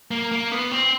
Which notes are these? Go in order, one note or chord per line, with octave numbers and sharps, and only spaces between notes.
A#3
A#3
B3
C4